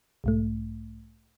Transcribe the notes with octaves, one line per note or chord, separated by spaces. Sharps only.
B1 G#2 A3